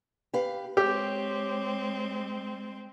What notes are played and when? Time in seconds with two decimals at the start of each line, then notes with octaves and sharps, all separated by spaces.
0.33 G4 B4 F5
0.77 G#3 C4 G4 C#5